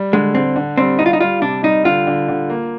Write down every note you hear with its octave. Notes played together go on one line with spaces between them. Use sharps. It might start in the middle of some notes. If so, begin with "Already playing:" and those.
Already playing: G3
D3 G#3
D3 C4
D3
G3 C4
G3 D#4
F4
D#4
G3 F4
C3 D4
G3 D#4
D3 F4
D3
D3
A#3